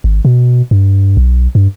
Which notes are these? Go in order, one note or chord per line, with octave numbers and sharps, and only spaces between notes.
G#1
B2
G2
B1
G2